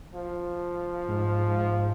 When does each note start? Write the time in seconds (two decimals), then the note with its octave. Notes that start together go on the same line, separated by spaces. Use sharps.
0.15 F3
1.08 G#2